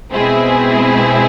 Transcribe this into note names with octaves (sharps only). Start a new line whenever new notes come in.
B2 G#3 C4 E4 G#4